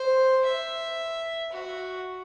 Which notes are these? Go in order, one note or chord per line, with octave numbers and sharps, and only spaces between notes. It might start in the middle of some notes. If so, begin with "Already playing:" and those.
Already playing: C5
E5
F#4